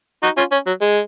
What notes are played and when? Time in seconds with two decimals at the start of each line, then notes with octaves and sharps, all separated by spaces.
0.23 D#4 F#4
0.37 C#4 F4
0.52 C#4
0.67 F#3
0.81 G#3